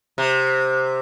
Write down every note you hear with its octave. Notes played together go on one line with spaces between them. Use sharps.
C3